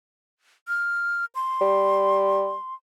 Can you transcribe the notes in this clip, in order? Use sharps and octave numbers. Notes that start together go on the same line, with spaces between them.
F6
C6
G3